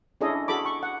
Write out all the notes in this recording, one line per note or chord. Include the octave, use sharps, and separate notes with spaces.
C#4 D4 E4 G#4 A4 D#5
F#4 G#4 A4 B5 D6
C#6
F#5